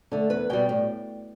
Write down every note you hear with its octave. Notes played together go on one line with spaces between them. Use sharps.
D3 A3
E2 B4
B2 G3 G5
A2